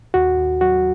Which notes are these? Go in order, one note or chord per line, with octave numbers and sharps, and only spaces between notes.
D#2 F#4
D#2
F#3 F#4